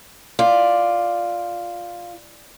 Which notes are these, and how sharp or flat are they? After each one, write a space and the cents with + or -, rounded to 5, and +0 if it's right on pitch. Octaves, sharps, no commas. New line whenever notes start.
F4 +0 D5 +0